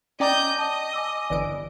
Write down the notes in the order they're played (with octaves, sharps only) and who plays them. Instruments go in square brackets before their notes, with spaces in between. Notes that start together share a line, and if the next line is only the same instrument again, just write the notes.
[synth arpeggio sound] C#4 D5 A#5 [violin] D#5 G6 [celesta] G5 D6
[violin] D#5 [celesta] A5
[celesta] G#5 D6 E6
[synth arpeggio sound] G1 E3 D7 [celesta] D5